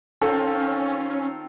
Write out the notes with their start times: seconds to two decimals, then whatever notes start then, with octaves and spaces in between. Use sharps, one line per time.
0.21 D#3 C4 C#4 F4 A4